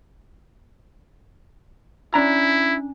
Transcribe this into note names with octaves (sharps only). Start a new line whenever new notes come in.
C#4 D4 E4 A#5